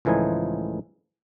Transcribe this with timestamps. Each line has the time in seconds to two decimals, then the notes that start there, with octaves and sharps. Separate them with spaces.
0.05 C#2 A2 E3 F3 D#4 G#5